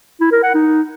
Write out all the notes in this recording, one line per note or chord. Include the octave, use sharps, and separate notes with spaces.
E4
A#4
F#5
D#4